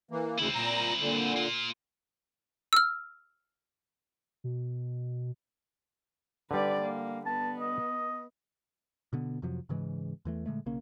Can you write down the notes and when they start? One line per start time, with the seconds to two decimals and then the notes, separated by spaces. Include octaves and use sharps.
0.11 E3 A#3
0.39 D2 C#3 E3 C4 E4
0.54 A#2 A#5
1.00 A#2 D3
1.36 A#3 F4
2.73 E6 F6
4.44 B2
6.51 D3 G3 B4 D5
6.81 A#3
7.26 B3 A5
7.60 D#5
9.13 B2 D3 B3
9.42 F2 C3 F3 F#3
9.69 G#2 C#3 E3 G#3
10.25 E2 E3 A3
10.46 A#2 D3 G#3 A3
10.66 B1 C#3 A#3 C#4